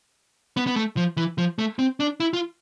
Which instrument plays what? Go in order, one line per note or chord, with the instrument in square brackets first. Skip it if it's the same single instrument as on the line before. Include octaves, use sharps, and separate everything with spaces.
[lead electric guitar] B3
B3
A3
F3
E3
F3
A3
C4
D4
E4
F4